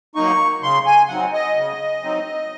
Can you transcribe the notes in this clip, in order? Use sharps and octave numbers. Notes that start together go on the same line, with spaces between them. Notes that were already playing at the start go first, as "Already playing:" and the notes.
F#3 A#3 D#4 C#6
C#3 C6
G#5
F#3 C4 D#4 F#5
D#5
C#3
F#3 C4 D#4